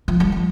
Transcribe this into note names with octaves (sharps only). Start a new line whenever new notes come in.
F3
G3
F3